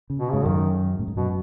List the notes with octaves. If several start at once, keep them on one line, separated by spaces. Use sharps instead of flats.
C#3
B2
G#2 C#3
F#2 D#3
A2
G#2
F#2 B2